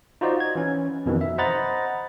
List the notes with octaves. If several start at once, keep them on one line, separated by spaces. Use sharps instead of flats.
D#4 F4 F#4 C5 D5 D#5
G#6
E3 C#4
F2 B2 D#3 E3
E5
C5 D#5 F#5 A#5 B5 A6